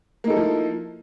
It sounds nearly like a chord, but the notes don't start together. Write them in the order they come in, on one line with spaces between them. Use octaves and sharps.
A#3 D#4 A4 E4 F3